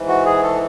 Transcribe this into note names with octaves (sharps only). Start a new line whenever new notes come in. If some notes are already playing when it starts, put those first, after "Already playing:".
Already playing: G#2 E3
F#4
G#4
A4